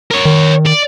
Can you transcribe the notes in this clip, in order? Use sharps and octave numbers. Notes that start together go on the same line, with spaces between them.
A#4 C#5
D#3
D5